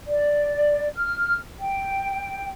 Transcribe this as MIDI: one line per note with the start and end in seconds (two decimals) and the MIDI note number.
0.06 0.88 74
0.96 1.37 89
1.59 2.49 79